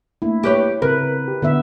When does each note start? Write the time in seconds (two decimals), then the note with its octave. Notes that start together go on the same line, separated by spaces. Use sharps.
0.22 A3 A#3 D4 E4
0.43 G4 B4 C#5
0.82 C#3 C4 A#4 B4
1.28 G4
1.42 D3 B3 E4 E5